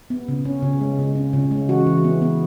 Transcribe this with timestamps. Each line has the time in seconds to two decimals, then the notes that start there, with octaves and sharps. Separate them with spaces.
0.10 B3
0.28 C#3
0.45 C#4
0.63 C#3
0.81 G#3
0.98 C#3
1.16 C#4
1.33 C#3
1.51 G#3
1.69 E3 F#4
1.86 E3
2.04 B3
2.21 B3